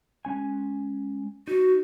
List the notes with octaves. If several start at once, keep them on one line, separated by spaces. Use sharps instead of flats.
G#3 C#4 G#5
D#4 F#4